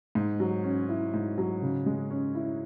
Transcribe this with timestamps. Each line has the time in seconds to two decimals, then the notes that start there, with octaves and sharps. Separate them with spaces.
0.15 G#2
0.40 F#3
0.64 C#4
0.89 E4
1.14 G#2
1.38 F#3
1.62 C#3
1.86 G#3
2.10 C#4
2.35 E4